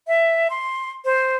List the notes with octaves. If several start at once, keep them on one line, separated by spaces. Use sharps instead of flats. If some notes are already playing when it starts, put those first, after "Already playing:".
E5
C6
C5